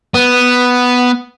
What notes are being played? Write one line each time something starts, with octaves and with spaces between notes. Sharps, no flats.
B3